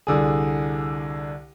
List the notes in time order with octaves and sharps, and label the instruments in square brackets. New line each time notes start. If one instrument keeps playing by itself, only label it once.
[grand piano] C2 D3 G#4